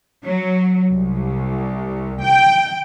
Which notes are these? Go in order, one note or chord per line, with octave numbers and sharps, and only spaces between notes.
F#3
C2
G5